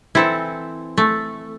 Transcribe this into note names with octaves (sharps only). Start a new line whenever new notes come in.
E3 C4 E4 A4
A3